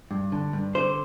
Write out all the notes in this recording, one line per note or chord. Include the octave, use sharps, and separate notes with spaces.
G2
D3
G2
D3 C5